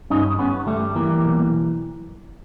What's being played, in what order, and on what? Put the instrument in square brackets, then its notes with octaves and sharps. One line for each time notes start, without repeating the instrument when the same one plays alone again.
[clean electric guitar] G2 C#4 D#4
G2 B3 C#4
G3 A3
E3 A#3
B1